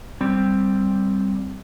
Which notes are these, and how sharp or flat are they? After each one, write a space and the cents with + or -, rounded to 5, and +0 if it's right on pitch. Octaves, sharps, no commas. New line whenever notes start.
G3 +0 C4 +0